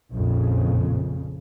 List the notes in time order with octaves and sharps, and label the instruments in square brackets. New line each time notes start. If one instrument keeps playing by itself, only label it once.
[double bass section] A#1 F2 C#3